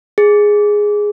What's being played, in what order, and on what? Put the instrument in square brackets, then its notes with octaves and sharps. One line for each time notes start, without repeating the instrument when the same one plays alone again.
[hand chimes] G#4